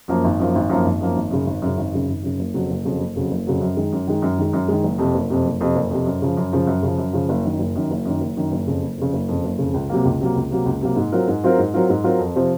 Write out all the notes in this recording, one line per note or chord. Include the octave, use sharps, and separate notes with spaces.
F#2 F3 A#3
G#1
F#2 F3 A#3
G#1
F#2 F3 A#3
G#1
F#2 F3 A#3
G#1
F#2 C#3
G#1
F#2 C#3
G#1
F#2 C#3
G#1
F#2 C#3
F#1
F2 C#3 F#3
F#1
F2 C#3 F#3
F#1
F2 C#3 F#3
F#1
F2 C#3 F#3
F#2
D#3 G#3
F#2
D#3 G#3
F#2
D#3 G#3
F#2
D#3 G#3
F#1
F2 C3
F#1
F2 C3
F#1
F2 C3
F#1
F2 C3
F#2
C#3 F3
F#2
C#3 F3
F#2
C#3 F3
F#2
C#3 F3
F#1
F#2 D#3
F#1
F#2 D#3
F#1
F#2 D#3
F#1
F#2 D#3
F#1
F2 C#3
F#1
F2 C#3
F#1
F2 C#3
F#1
F2 C#3
C#2
C3 F#3 A#3
C#2
C3 F#3 A#3
C#2
C3 F#3 A#3
C#2
C3 F#3 A#3
G#2
F#3 C4 F4 A#4
G#2
F#3 C4 F4 A#4
G#2
F#3 C4 F4 A#4
G#2
F#3 C4 F4 A#4
F2
C3 F3 C4